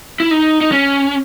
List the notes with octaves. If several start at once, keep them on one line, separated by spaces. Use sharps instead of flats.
E4
D#4
D#4
C#4